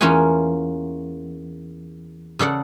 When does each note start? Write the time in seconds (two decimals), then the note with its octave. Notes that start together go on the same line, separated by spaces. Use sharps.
0.01 E2 A#3 C#4 F4 F#5 G#5
2.39 C#3 A4 D5 F#5